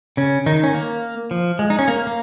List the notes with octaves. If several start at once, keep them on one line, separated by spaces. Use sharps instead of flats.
C#3 C#4
D#3 D#4
C#4
A#3
F3
G#3
D#4
C#4
A#3
A#3